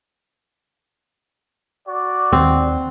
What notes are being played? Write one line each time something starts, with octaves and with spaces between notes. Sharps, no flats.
F#4 D5
D#2 D#3 C4